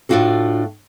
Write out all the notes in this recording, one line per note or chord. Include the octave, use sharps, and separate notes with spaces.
A2 C4 D4 F4 F#4 A4